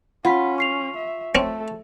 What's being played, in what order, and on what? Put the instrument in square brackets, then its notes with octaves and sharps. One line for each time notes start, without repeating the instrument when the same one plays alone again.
[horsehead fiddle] C#4 [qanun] F4 [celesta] F#5 B5 B6
[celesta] C#6 C7 F7
[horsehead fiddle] E5
[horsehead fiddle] A3 A4 [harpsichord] C4 C#4